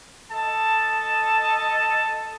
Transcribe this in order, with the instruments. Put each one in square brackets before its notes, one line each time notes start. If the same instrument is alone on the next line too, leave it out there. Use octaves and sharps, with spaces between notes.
[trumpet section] A4 D#5 A5